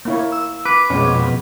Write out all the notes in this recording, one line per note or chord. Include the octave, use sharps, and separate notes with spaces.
A#3 E4 C#5
E6
B4 D6
F2 B2 G#3 C#4